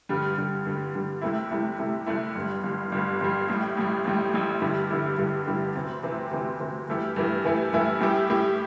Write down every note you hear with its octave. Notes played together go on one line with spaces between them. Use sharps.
G2 D3 G3
G2 D3 G3
G2 D3 G3
G2 D3 G3
C2 C3 A3 E4
C2 C3 A3 E4
C2 C3 A3 E4
C2 C3 A3 E4
G1 G2 G3
G1 G2 G3
G1 G2 G3
G1 G2 G3
A1 A2 G3
A1 A2 G3
A1 A2 G3
A1 A2 G3
G2 D3 G3 E4 G4
G2 D3 G3 E4 G4
G2 D3 G3 E4 G4
G2 D3 G3 E4 G4
D2 C3 E3 C4
D2 C3 E3 C4
D2 C3 E3 C4
D2 C3 E3 C4
G2 E3 A3 E4 G4
G2 E3 A3 E4 G4
G2 E3 A3 E4 G4
G2 E3 A3 E4 G4
A2 G3 E4 G4
A2 G3 E4 G4